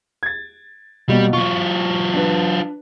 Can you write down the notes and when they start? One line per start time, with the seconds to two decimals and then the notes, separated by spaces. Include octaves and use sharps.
0.23 G#6 A6
1.09 B2 G3 A#3
1.33 F#3 F4 C#6
2.13 D4 B4